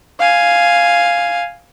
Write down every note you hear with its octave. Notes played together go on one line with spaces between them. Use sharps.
F5 G#5